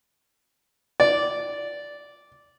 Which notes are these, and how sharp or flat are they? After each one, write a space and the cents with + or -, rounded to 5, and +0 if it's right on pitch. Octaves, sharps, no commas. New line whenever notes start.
D5 -10